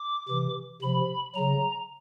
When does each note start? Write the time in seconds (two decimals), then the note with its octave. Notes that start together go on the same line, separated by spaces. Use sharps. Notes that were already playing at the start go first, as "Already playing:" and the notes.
Already playing: D6
0.29 C3 E3
0.82 C3 F3 B5
1.35 C#3 F#3 A#5